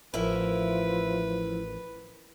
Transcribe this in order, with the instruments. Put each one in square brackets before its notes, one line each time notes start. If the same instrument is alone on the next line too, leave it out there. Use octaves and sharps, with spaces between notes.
[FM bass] A1 [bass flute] F3 [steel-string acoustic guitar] E4 A#4 E5 [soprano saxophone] B4